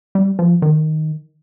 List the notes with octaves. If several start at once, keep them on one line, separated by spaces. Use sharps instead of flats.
G3
F3
D#3